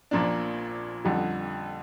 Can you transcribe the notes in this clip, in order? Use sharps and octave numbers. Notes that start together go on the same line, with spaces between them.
A#1 A#2 F3 A#3 D4
F2 D3 G3